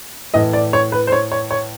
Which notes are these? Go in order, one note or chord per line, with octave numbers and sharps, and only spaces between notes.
A2 E3 D#5
D5
C#5
B4
C5
C#5
C#5
C#5